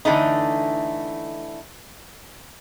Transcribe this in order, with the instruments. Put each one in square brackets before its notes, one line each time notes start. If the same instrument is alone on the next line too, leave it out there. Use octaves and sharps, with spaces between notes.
[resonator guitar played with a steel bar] D3 E3 A3 D#4